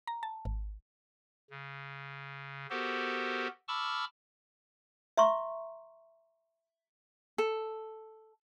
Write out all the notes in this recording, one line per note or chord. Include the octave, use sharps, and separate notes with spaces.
A#5
A5
G#1
C#3
B3 F#4 G4 A4 A#4 C5
A5 B5 C#6 D6 E6 F6
E5 A#5 C6 C#6
A4